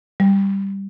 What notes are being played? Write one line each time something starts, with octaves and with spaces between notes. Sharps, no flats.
G3